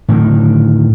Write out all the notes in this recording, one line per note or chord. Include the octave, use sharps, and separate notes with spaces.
A2 D3 D#3